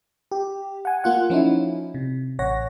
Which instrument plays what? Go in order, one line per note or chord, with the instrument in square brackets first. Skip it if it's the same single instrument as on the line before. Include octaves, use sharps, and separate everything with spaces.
[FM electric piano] G4
F#5 G#5
A#3 F4 F#5
F3 C#4 D#4 E4
C3
A1 C#5 F#5 A#6